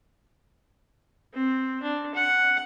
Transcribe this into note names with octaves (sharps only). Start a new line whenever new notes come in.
C4
D4
F#5